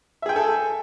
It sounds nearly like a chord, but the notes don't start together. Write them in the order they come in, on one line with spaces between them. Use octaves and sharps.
E5 G#4 G5 G#5 A4